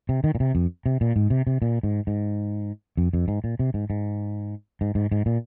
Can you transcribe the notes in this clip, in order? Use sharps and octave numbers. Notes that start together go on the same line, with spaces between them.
C3
D#3
A#2
C3
F2
C3
A#2
G#2
C3
C3
A#2
G#2
G#2
F2
F2
G#2
A#2
C3
G#2
G#2
G#2
G#2
G#2
A#2